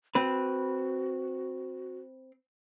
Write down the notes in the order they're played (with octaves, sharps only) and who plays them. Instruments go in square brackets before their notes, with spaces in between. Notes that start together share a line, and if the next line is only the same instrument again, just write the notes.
[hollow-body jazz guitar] C4 B4 [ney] F#4